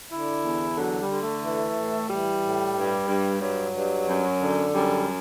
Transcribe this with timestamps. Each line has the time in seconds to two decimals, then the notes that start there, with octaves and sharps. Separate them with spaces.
0.11 D3 E4
0.44 E2
0.77 D3 F#3
0.99 G3
1.10 D3
1.21 A3
1.43 E3
1.76 A2
2.09 E3 G3
2.42 A2
2.75 G2
3.08 G2
3.41 G2 F#3
3.74 G2
4.07 F#2
4.40 D3
4.73 F#2 G3